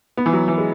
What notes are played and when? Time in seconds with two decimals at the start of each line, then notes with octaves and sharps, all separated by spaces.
0.17 B3
0.26 E3
0.33 F#3
0.48 E3
0.58 G#3